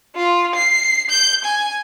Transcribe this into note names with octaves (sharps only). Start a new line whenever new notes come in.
F4
C7
G6
G#5